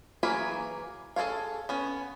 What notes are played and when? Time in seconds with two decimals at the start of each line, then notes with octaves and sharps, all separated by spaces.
0.23 E3 F#3 A#3 G#4 B5
1.16 G#4 A4 B4 C#5 F5
1.69 B3 C#4